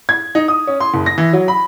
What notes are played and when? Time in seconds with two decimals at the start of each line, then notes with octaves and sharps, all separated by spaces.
0.09 G#6
0.35 D#4
0.48 D#6
0.67 C#4
0.80 C6
0.94 F#1
1.06 A#6
1.18 E3
1.33 F#3
1.48 B5